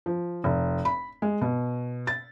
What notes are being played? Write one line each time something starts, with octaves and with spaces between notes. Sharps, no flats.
F3
F1
B5
G#3
B2
A6